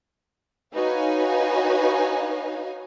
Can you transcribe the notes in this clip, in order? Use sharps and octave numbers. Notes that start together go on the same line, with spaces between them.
D#4 F#4 B4 C#5 F5 G#5